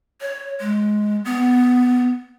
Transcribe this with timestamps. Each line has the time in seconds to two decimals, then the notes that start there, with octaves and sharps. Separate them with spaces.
0.21 C#5
0.60 G#3
1.25 B3